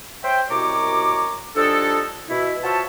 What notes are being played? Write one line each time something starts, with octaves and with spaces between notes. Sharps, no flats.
C5 C#5 E5 G5
C2 F#2 B2 C#5 A#5 D6
F3 G3 D4 D#4 G#4 A4
B2 E4
F4 F#4 C5 C#5 E5 A5